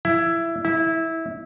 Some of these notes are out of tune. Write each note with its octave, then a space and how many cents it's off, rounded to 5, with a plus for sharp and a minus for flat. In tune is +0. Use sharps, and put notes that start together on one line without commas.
E4 +15
E4 -15